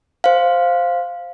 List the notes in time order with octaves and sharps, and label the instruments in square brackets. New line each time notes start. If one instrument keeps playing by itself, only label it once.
[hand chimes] C5 F5